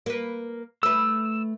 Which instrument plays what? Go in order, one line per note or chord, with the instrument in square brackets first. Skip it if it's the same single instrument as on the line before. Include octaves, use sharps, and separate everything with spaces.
[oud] A#3 B4
[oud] A3 B4 [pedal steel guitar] E6